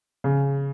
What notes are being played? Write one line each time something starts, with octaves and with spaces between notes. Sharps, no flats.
C#3